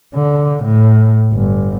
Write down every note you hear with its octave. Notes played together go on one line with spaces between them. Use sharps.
D3
A2
G1